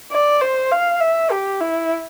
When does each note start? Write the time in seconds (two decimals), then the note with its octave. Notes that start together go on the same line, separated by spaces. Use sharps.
0.12 D5
0.41 C5
0.72 F5
1.00 E5
1.31 G4
1.61 E4